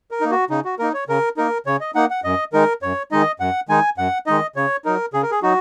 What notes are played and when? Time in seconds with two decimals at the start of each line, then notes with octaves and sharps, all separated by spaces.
0.11 A#4
0.21 A#3 D#4
0.31 F#4
0.50 C#3 D#4
0.65 F#4
0.79 A#3 D#4 A#4
0.94 C#5
1.08 C#3 A#4
1.37 A#3 D#4 A#4
1.66 C#3 C#5
1.81 D#5
1.95 A#3 D#4 F#5
2.10 F#5
2.24 F#2 D#5
2.53 D#3 G#3 D#4 A#4
2.82 F#2 C#5
3.12 D#3 G#3 D#4 D#5
3.40 F#2 F#5
3.69 D#3 G#3 D#4 G#5
3.98 F#2 F#5
4.26 D#3 G#3 D#4 D#5
4.56 C#3 C#5
4.85 F#3 D#4 A#4
5.13 C#3 G#4
5.23 A#4
5.31 G#4
5.42 F#3 D#4 F#4